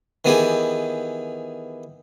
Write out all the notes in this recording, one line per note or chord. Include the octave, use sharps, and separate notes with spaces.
D#3 E3 B3 G4 G#4